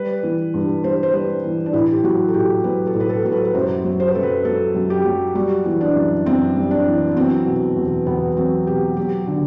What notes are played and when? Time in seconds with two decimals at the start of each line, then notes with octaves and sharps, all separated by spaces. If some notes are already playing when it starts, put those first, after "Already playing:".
Already playing: G3 B4
0.23 E3
0.54 G2
0.83 G2 C5
1.03 C5
1.13 G3 B4
1.44 E3
1.66 D4
1.73 A2 E4
1.93 G4
2.03 F#3 F#4
2.28 A4
2.34 A2 G4
2.64 F#3 B4
2.87 A4
2.95 A2
3.00 B4
3.09 A4
3.24 F#3 A4
3.32 B4
3.45 B4
3.54 F#2 C5
3.84 F#3
4.00 C5
4.08 B4
4.15 F#2 A4
4.23 B4
4.45 F#3 A4
4.75 F#2
4.90 G4
5.05 F#3
5.35 G3 F#4
5.65 E3
5.81 D4
5.96 F#2
6.26 F#2 C4
6.56 G3
6.71 D4
6.86 E3
7.11 B3
7.16 F#3 C4
7.46 B2
7.77 E2
8.06 E2 B3
8.37 F#3 C4
8.67 B2 G4
8.97 F#3 G4
9.27 D3